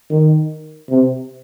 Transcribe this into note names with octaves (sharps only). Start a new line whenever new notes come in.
D#3
C3